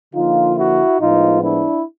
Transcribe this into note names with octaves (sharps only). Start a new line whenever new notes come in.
D3 F3 A#3 D#4 F4
E4 F#4
A2 F3 G#3 B3 D#4 F4
D4 E4